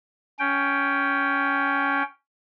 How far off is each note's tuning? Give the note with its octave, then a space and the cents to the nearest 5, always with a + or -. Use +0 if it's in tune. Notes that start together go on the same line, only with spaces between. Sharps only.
C#4 +15 G5 +0